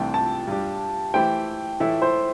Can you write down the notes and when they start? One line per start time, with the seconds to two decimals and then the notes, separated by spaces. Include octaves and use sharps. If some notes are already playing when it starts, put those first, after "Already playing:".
Already playing: C2 C3 E3 A3 D4 G5
0.14 A5
0.47 G2 G3 D4 G4
1.14 E3 A3 E4 G4 C5 G5
1.80 A2 E3 A3 E4 A4 E5
2.02 C5